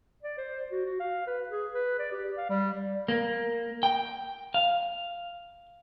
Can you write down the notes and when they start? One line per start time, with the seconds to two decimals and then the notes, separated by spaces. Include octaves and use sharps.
0.23 D5
0.38 C5
0.72 F#4
0.85 F#4
1.00 F5
1.27 B4
1.49 G#4
1.74 B4
1.99 D5
2.12 G4
2.38 F5
2.50 G3
3.08 A#3
3.83 G5
4.54 F5